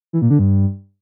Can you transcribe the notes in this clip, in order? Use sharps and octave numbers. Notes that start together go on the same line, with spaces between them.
E3
A#2
D3
G2